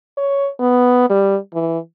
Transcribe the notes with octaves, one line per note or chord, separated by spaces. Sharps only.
C#5
B3
G3
E3